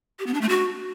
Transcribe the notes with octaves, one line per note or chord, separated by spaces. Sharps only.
G4
B3
D4
A3
F#4